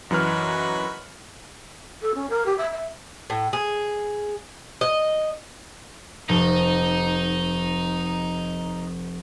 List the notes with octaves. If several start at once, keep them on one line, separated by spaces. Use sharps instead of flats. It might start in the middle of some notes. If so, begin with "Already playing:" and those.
F#2 E3 D#4 F#4 B4 F6
A4
C#4
A#4
G4
E5
E5
A2
G#4
D#5
F1 D#4